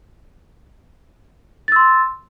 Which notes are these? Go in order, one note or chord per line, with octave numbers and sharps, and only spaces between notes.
C6 E6 A6